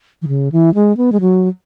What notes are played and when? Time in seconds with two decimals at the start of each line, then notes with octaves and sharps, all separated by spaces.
0.22 E3
0.28 C#3
0.52 E3
0.74 G#3
0.97 B3
1.12 G#3
1.21 F#3